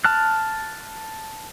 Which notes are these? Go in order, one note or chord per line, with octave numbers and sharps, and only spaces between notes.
A5 F6 F#6